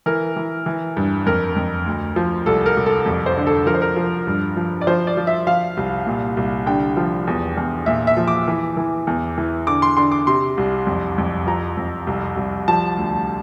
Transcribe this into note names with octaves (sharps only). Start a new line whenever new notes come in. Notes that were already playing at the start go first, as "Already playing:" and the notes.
E3 A#4
E3
E3
G2
F2 A#4
F2
D2
F3
C2 A4
A#4
C2
A4
F2
C5
D3
A4
F3 A#4
C5
A#4
F3
G2
F3
D5
F3 C5
D5
F3
E5
F3 F5
C2
A#2
C2
D3 G5
F3
E2
E2
A#2 E5
E5
F3
D6
E3
E3
E2
E3
D3 D6
C6
D3 C6
D6
C3 C6
C2
F2
F2
F3 A#5
F2
C2
C2
F3 A5
D2